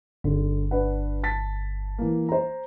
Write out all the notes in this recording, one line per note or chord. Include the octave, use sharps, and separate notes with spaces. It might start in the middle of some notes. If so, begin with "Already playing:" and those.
G1 D3
D4 B4 F#5
A5 A6 B6
E3 A#3
C5 A#5